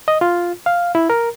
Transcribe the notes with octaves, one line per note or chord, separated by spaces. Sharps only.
D#5
F4
F5
E4
A#4